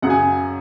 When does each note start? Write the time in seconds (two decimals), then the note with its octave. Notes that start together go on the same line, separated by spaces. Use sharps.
0.02 F#2 C#3 F#3 F#5
0.10 G#5